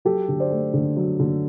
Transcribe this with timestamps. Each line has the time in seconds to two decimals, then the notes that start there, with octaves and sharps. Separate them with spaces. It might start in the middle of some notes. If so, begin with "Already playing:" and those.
0.05 F#3 G4 A4
0.28 D3
0.40 C5 D5
0.51 A3
0.74 D3
0.97 F#3
1.20 D3